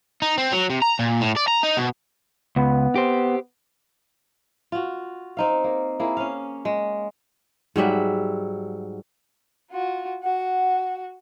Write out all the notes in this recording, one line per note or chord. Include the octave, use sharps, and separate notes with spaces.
D#4
C4
F#3
C3
A#5
A#2
A2
D5
A#5
D#4
B2
C#2 B3
G4 C5
F4 F#4
C4 D#4 F5
A#3
A#3 E4 G#4
C#4 F5
G#3
G#2 F#3 G3 E5
F4 F#4
F#4 F#5